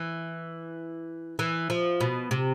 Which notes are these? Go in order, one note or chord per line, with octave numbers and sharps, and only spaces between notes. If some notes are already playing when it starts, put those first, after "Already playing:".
Already playing: E3
E3
F3
B2
C3